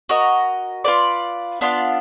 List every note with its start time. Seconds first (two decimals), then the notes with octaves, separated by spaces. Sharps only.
0.09 F#4 A#4 D#5
0.84 F4 B4 D5
1.61 B3 D4 F4